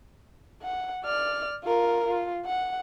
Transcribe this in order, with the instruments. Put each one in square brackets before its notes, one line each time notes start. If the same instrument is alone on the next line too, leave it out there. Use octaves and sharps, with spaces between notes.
[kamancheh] F#5
D5 F6
F4 A#4
F4
F#5